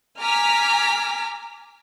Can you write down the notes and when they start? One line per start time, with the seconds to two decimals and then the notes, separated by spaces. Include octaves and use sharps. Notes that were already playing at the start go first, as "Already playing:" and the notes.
0.20 G#5 A#5 D6 F6 B6